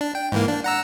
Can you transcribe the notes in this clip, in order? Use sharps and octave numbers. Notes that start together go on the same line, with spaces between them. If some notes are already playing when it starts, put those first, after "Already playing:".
D4
G5
G#2 E3 A#3
D4
F#5 A#5 E6